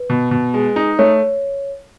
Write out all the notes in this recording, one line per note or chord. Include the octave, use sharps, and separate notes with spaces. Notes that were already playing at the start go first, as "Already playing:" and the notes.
Already playing: B4
B2
B2
G#3
D#4
A3 C#5